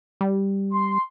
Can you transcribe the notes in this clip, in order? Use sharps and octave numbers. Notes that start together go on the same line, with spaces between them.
G3
C6